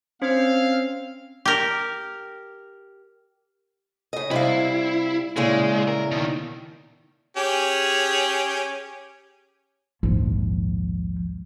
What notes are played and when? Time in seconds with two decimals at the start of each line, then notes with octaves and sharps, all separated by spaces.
0.22 C4 C#4 C5 F5 G#6
1.45 G4 A#4
4.13 C#3 D#5
4.31 C3 G3 E4 F5
5.36 A#2 C#3 G#3 E4
5.88 A#4
6.11 B2 D#3
7.37 C#4 G4 G#4
10.03 A#1 D#2 G#2 F3